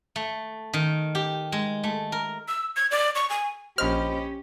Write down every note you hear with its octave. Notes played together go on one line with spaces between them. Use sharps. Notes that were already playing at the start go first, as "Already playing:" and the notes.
A3
D#3
G4
G#3
A3
A#4
E6
G#6
D5
C#6
G#5
A#1 C#4 G4 C5 D#5 B5 F6